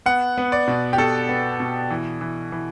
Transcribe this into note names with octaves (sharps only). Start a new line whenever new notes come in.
B3 F#5
B3
D5
B2
G4
B2 A4
B3
B2
E3
E3
E3